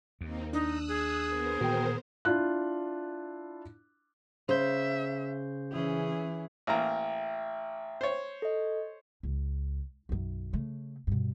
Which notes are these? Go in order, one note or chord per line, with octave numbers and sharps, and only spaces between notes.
D#2 A#3 C4 D#4
D4 D#4 D#6 E6 F#6
G#4
B3 A#4 C5
A#2 D#3 E3 F#4 G5
D4 E4 F4 F#6
C#3 C5 E5 G6
E3 C#4 G#4
A1 A#3 E5 G5 A#5
C5 C#5
A4 D#5
C#2
B1 F#2
C#3 A3
G2 B2